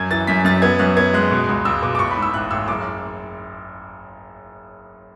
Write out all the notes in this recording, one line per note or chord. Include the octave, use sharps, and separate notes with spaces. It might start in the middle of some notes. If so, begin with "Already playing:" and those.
Already playing: F#2 G#6
E3 A6
F#2 B6
F#2 A6
B3 G#6
F#2 F#6
B3 G#6
G#3 F#6
B2
C#2
C#2 E6
B2 D6
D6
A1 C#6
B5
G#2
E6
A1 F#6
A1 E6
F#1 D6